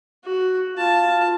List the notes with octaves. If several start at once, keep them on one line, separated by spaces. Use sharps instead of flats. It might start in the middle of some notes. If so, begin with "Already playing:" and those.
F#4
F4 A5